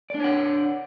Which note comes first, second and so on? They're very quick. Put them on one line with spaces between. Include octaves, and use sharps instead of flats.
D5 D4 C#5 F#5